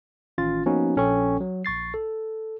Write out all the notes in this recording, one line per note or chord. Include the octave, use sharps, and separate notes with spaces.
A1 D#3 C#4 F4 A6
F3 A#3 B3 C#4 D#4 F#4
A#1 C#4 A4 G5 C#6
F#3
A#1 C#6 A6 C7
A4